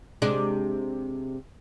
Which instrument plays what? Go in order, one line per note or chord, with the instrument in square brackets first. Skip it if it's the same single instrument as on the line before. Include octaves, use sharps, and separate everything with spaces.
[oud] C3 G#3 D4